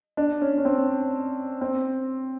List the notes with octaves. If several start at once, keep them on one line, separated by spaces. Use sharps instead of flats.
D4
C#4
C#4
C4
C4